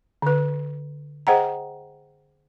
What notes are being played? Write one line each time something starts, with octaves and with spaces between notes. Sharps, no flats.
D3 B4
G#4 C5 D#5 F#5 G5 A#5